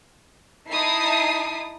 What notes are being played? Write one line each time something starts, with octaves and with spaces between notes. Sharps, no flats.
D#4 E4 A5 D#6 C7